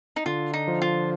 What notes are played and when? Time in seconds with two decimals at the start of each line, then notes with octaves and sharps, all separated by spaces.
0.16 D#4
0.26 D3 F4
0.53 D#4
0.68 F3
0.82 F4